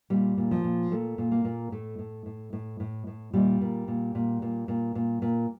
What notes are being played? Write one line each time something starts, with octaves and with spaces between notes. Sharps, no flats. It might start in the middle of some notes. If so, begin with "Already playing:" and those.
A#2 G3
A#2
F3
A#2
A#2 A3
A#2
A#3
A#2
A2 A3
A2
A2
A2
A2
A2
A#2 G3
A#2
A#2
A#2
A#2
A#2
A#2
A#2